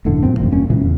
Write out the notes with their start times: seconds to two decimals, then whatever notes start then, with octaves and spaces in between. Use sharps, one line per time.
0.05 E1 F#2 A2 D3
0.23 G2 A#2 F#3 C4
0.37 D#1 G#1 F2 A#3
0.51 F1 G2 A#3 C#4
0.70 A#2 C#3 E3 G#3
0.81 E2